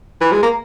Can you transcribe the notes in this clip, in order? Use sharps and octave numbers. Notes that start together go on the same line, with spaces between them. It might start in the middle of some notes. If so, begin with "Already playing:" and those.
E3
G#3
A#3